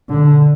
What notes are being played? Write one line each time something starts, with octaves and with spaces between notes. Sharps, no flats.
D3